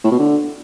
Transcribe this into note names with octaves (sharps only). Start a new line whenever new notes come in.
A2
B2
D3